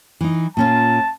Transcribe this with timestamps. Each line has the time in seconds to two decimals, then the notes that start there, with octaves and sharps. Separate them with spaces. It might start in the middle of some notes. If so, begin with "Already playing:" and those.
0.21 E3 D#4
0.57 A#2 C#4 F4 A5